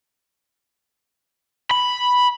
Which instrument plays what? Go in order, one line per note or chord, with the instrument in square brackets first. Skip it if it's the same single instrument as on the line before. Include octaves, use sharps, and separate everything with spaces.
[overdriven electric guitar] B5